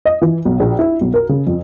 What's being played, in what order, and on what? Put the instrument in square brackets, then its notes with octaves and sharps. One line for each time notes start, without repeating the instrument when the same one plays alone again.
[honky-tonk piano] D#5
E3
B1
A#1
E4
B1
A#4
C#3
F2